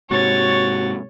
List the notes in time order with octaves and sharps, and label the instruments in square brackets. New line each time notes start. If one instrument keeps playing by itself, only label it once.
[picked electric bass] G#2 C3 [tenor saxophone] F#4 [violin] C#5 A6